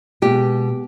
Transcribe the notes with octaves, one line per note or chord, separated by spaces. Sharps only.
B2 G#3 G4